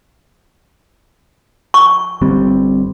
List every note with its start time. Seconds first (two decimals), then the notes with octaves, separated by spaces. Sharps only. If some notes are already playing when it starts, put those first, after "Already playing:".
1.74 C#6
2.22 G1 G3 C4